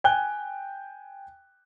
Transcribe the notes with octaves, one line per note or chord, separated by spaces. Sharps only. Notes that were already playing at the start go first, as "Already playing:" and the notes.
G5 G#5 F#6 G7